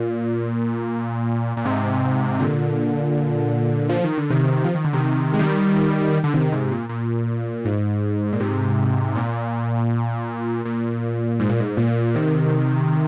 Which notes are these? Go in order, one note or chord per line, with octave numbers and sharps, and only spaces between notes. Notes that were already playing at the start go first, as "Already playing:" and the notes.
Already playing: A#2
A#2
G#2 C3
A#2 D3
F3
D#3
D3
C3 D#3
F3
D#3
D3
C3 D#3
G#3
D#3 G3
D3
C3 D#3
G#2 C3
A#2
A#2
G#2
A#2
G#2 C3
A#2
A#2
G#2
A#2
G#2
A#2
C3 D#3